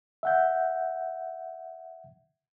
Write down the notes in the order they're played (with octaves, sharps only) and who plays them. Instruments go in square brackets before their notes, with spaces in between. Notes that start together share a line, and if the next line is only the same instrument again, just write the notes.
[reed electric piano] E5 F#5 G6